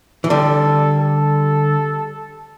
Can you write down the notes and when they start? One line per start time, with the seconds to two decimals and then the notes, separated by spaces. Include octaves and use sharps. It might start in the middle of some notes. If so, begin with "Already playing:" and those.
0.24 E3
0.30 D3 G3 A4
0.99 A4